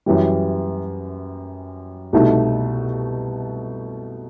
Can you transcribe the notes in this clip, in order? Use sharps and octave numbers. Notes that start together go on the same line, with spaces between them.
F#2 E3 G3
C2 B2 A3 D#4